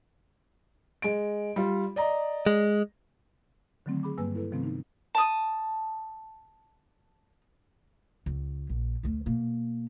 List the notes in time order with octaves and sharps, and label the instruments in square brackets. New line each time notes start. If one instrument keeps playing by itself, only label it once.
[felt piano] G#3 D7
G3 F4
D5 D#5 A#5
[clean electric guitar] G#3
[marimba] D3 D#3 F#3 A3 C4
G#4 B5 D6
G2 G3 A#3 B4 G#5 E6
E4 A4 B4
C3 D#3 F3 A3 B3 C4
D#4
[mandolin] A5 D#6
[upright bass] C#2
A#1
D2 A3
B2 A#3